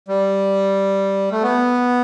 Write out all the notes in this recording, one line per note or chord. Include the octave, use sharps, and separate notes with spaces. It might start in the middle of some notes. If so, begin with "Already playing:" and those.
G3
A3
B3